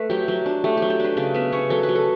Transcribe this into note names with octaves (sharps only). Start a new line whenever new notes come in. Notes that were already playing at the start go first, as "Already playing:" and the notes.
Already playing: A3 B4
F#3 G4
F#3
D4
A3 G4
F#3 G4
G4
D4 B4
C#3 D5
B3 E5
C#3 C#5
F#3 A4
B4
F#3
A4